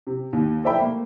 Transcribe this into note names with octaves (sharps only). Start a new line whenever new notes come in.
C3
D#2
A4 C5 D5 E5 G5 B5
A3 A#3